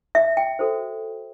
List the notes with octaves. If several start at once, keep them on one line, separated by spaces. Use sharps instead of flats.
E5
G5
F#4 A4 C5